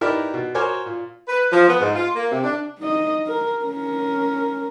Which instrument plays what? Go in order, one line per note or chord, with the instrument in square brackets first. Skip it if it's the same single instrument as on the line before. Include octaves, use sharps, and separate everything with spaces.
[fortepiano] D#4 E4 G4 A#4 B4 D5
B2
F#4 A#4 C5 C#5 G#5 D6
A#2
[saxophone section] B4
F3
B3
G#2
F4
A#3
C3
D4
[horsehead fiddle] D#4 D#5
A#4
C#4 A#4